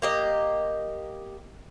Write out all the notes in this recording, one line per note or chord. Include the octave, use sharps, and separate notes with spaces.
A#3 G4 D#5